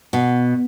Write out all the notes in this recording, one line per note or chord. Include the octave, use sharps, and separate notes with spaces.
B2